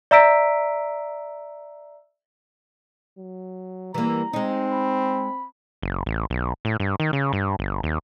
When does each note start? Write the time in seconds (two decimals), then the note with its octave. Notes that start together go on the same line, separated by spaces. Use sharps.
0.11 D5 E5 A#5 E6 B6 D7
3.18 F#3
3.94 E3 G3 A#3 A#5
4.33 G#3 C4 D#4
4.72 B5
5.82 F#1
6.06 A1
6.30 B1
6.65 A2
6.80 G2
7.00 D#3
7.13 C#3
7.33 G2
7.59 G1
7.83 D#2